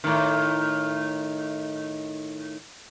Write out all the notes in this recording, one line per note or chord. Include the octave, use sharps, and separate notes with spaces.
A2 D#3